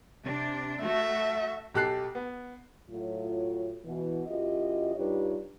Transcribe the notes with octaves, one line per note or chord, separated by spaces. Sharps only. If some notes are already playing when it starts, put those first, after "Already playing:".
C3 D4
A3 F#4 E5
B1 G4 A4 F#6 C7
B3
A2 F#3 F4
B2 E3
F#2 E4 F4 G4 D#5
G2 D#4 F4 G4 B4 C#5